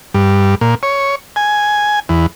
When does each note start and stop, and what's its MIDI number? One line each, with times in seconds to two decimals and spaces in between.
0.14 0.55 43
0.61 0.75 46
0.83 1.15 73
1.36 2.00 80
2.09 2.26 40